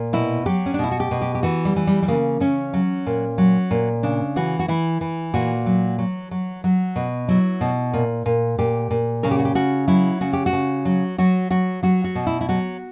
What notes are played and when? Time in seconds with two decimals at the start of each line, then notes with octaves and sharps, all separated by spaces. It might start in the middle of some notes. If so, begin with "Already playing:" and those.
Already playing: A#2
0.13 B2 E4
0.46 F#3 G4
0.66 C#4
0.74 D4
0.79 B2 E4
0.91 F#4
1.00 G4
1.11 B2
1.22 G4
1.35 G4
1.43 E3 F#4
1.65 G3
1.76 E3
1.87 G3
2.02 G3
2.08 C#3 A#3
2.40 C#3 C#4
2.73 F#3
3.06 A#2
3.38 F#3
3.71 A#2
4.03 C#3 D4
4.36 E3 F#4
4.59 F#4
4.68 E3 E4
5.01 E3
5.34 A#2 F#4
5.66 F#3
5.98 F#3
6.31 F#3
6.64 F#3
6.96 B2
7.28 F#3 E4
7.61 B2
7.94 A#2
8.26 A#2
8.58 A#2 G4
8.91 A#2
9.23 C#3 A#4
9.31 G4
9.39 F#4
9.45 G4
9.55 C#3 F#4
9.88 F#3 E4
10.21 C#3 F#4
10.33 G4
10.46 F#4
10.53 C#3
10.85 F#3
11.18 F#3 F#4
11.51 F#3 F#4
11.83 F#3 F#4
12.04 F#4
12.15 B2
12.27 E4
12.41 E4
12.49 F#3 F#4